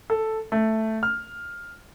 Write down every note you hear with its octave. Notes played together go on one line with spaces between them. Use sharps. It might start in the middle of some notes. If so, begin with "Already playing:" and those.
A4
A3
F6